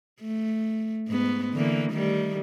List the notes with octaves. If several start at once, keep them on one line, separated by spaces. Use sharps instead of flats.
A3
G#2 B3
D3 E3 A#3
D#3 G3 A3